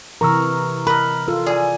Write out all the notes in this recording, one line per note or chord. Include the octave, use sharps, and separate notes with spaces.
C3 E3 A#4 A#5 C#6 E6
A#4 B4 D#5 B5
F4 A4
G#4 D5 G#5